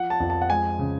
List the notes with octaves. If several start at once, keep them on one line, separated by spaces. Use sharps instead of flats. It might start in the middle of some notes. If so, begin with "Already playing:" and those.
Already playing: F3 F#5
A5
F2
A5
F#5
G#3 G#5
C#3